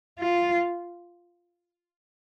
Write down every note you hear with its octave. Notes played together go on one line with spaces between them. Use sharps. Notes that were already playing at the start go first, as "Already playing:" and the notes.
F4